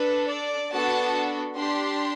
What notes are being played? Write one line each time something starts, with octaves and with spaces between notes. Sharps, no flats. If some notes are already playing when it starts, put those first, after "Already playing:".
Already playing: D4 A4 B4
D5
B3 D4 F#4 A4 A5
D4 G4 C6